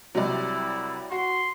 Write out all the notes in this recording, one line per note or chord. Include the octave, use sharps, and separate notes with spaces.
C2 C3 F#3 E4 D5
F#4 C6